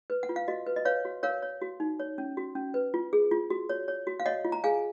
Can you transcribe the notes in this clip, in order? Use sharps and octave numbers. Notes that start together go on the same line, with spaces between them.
B4
F#5
F4
F5
F#4 D#5
B4
D#5
B4 C#5 F5
F#4
A#4 C#5 F5
C#5
F#4
D#4
C#5
C#4
F#4
C#4
B4
F4
G#4
F4
F#4
C#5
C#5
F#4
F5
C#5 D#5 F#5
F4
A#5
G#4 F5 G#5